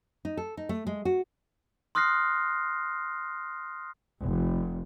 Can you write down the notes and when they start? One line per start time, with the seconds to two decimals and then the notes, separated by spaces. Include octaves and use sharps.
0.25 D#4
0.37 A4
0.57 D#4
0.69 A3
0.87 G#3
1.05 F#4
1.95 C6 D#6 F6 F#6 A#6 C7
4.22 F1